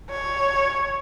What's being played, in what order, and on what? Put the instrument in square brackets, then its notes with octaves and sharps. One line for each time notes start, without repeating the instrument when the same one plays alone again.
[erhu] C#5